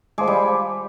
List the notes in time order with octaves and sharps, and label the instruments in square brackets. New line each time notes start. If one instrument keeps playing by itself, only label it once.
[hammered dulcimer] G#3 [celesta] C5 F5 A5 D6
[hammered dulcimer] G3
[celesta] C5 F5 A5 D6